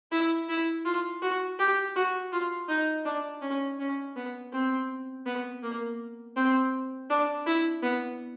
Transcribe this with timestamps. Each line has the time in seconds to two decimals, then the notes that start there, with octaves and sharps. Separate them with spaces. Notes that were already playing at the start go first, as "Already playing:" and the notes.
0.11 E4
0.48 E4
0.85 F4
1.22 F#4
1.59 G4
1.96 F#4
2.32 F4
2.68 D#4
3.05 D4
3.41 C#4
3.79 C#4
4.16 B3
4.52 C4
5.26 B3
5.62 A#3
6.36 C4
7.10 D4
7.46 E4
7.82 B3